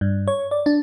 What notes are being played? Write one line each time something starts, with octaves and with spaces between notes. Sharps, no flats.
G2
C#5
D5
D4